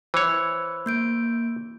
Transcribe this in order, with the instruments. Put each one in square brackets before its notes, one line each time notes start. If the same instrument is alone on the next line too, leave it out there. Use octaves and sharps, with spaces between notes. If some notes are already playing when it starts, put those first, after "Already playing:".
[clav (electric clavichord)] E3 C#5 [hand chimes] C5
[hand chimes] A#3 G6 D7